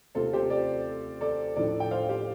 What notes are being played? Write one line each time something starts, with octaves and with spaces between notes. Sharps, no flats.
C3 A3 C4 F4 A4
G4 C5
A4 D5
A4 D5
A2 F3 D4 A4 D5
G5
C5 F5
G4 C5